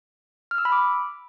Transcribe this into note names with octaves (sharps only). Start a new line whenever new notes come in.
F6
E6
B5
D6